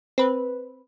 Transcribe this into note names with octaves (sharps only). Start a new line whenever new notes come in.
C4 B4